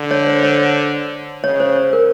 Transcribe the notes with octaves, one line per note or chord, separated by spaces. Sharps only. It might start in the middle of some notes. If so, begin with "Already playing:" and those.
Already playing: D3
C#5
C5
C#5
C#3 C#5
C5
A#4